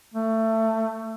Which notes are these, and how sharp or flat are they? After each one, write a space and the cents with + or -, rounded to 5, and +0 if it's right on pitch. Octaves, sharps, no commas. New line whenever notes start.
A3 +20